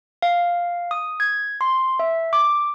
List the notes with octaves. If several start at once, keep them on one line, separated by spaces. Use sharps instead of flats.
F5
D#6
G#6
C6
E5
D6